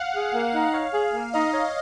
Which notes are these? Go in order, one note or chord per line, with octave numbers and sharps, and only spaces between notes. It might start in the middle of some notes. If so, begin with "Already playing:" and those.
Already playing: F5 F#5
G#4
A#3
D#4
C#5
G#4
A#3
D#4 D#5
C#5